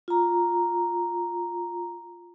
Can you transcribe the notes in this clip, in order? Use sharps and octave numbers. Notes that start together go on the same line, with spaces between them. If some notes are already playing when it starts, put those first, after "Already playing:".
F4 A#5